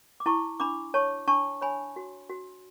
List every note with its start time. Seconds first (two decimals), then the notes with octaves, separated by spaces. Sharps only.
0.20 D6
0.26 E4 A5 C#6
0.60 D4 B5 D6
0.94 C#5 A5 C#6
1.27 D4 A5 C#6
1.61 C#5 G#5 B5
1.96 F#4
2.30 F#4